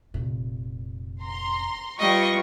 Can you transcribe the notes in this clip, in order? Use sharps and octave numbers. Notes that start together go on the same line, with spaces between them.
F1 A#2
A#5 C6
G3 F4 B4 D#5 C#6